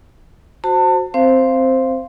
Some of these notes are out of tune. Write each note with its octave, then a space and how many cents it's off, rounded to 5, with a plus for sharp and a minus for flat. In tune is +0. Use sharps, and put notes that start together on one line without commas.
F#4 +0 C5 +0 A5 +30
C4 +0 C5 +0 F5 -15